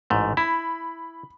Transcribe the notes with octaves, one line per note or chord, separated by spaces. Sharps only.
A1 G#2 A3
E4 B5